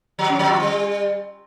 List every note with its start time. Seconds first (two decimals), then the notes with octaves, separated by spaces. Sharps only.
0.19 F3
0.29 C#4
0.39 F3
0.50 F4
0.60 G3